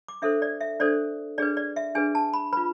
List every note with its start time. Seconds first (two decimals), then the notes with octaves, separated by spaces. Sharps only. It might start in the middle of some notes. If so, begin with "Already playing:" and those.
0.08 D6
0.22 D4 A4 C5 E5
0.42 D5
0.61 E5
0.80 D4 A4 C5 D5
1.38 D4 G#4 B4 D5
1.57 D5
1.76 E5
1.95 D4 G#4 B4 G#5
2.15 A5
2.34 B5
2.53 F4 B4 B5